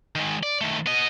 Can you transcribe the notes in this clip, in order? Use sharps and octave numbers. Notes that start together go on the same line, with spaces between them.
D#3 G#3
D5
D#3 A3
B3 D#5